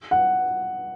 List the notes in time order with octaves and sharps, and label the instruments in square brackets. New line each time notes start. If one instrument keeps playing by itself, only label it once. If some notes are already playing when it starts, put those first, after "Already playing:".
[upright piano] F#5